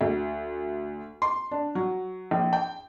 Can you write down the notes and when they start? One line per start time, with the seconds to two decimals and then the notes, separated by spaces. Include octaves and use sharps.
0.01 D2
1.22 C6
1.51 D4
1.75 F#3
2.31 A#1
2.53 G5